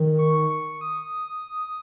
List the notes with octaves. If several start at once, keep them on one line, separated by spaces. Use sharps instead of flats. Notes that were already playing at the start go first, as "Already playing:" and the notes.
Already playing: D#3
C#6
C#6
D#6